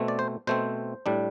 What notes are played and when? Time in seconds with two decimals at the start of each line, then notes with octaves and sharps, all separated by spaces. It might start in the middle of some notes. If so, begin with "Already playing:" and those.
Already playing: B2 A3 C4
0.08 D5
0.19 C5
0.47 B2 A3 C4 C5
1.06 A2 G3 D4